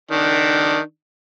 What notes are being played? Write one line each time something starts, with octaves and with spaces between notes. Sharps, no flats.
D#3 D4